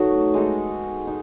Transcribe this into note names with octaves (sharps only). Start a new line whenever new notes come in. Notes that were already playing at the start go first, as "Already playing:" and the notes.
Already playing: F#3 A3 B3 D#4 F#4
G#3 D#4 A4
D#4